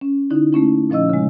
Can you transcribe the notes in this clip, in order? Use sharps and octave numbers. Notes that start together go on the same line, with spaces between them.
C#4
D3 D#4 E4
A3 A#3 C#4 E4
A#2 F3 C#4 D#5 E6
C#3 G#3